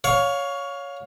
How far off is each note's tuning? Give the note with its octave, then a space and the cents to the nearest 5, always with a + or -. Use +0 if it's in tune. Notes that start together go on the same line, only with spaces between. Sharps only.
C#5 +15 F5 +20